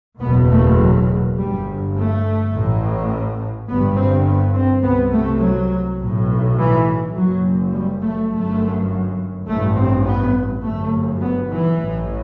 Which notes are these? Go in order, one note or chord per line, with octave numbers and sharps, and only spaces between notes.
F#1 E2 B2 B3
A3
F#3
G1 G2 G3
A3
A1 A2
G1 G2 B3
C4
B3
C4
C2 C3 B3
A3
F#3
B1 A2
E3
F#1 F#2 F#3
G3
A3
G1 F#2 A3
A1 G2 A3
C4
B3
G1 F#2 A3
B3
E3
A1 A2